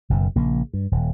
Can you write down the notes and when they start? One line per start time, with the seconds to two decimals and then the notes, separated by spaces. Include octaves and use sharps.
0.10 F#1 F#2 B2
0.36 A#1 C#3 A#3
0.74 G2
0.92 D#1